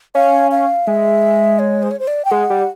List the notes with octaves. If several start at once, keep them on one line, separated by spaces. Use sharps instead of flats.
C#4 F5
F5
G#3 E5
C#5
C5
C#5
C5
D5
G5
G#3 F#5
G3